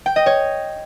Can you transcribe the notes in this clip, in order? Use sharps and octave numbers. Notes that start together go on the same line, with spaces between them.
G5
D#5
C#5